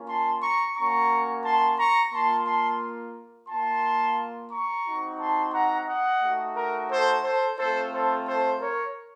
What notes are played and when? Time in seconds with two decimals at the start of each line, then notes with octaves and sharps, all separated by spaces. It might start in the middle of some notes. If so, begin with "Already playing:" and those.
Already playing: A#3 C#4 F4
0.08 A5 C6
0.42 A#5 C#6
0.76 A#3 C#4 F#4 A#5 C#6
1.44 A5 C6
1.79 A#5 C#6
2.13 A#3 F4 A5 C6
2.47 A5 C6
3.49 A#3 F4 A5 C6
4.51 A#5 C#6
4.85 C4 D#4 F#4
5.20 A5 C6
5.53 F#5 A#5
5.88 D#5 F#5
6.22 A3 D#4 F#4
6.56 A#4
6.90 A4 C5
7.24 A4 C5
7.58 A3 C4 F4 A4 C5
7.92 A4 C5
8.26 A4 C5
8.61 A#4 C#5